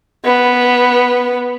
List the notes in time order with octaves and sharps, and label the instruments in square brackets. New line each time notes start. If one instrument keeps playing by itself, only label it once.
[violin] B3